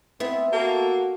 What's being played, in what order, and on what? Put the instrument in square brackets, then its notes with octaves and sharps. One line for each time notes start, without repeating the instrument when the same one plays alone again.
[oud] B3 E4 [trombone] C4
[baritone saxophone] A#3 [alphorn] F#4 [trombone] A4